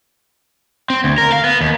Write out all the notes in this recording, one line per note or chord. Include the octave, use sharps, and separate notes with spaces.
C4
D2
A#4
F5
B3
D#2